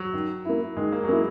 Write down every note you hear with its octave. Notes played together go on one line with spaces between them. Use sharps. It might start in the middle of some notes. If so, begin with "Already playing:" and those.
Already playing: F#3
D#3
A#3 E4
D#3 G#3
A#3
F#3
G#3 A#3 E4